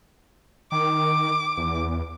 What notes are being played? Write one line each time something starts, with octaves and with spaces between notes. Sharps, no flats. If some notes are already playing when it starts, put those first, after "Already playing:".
D#3 D6
E2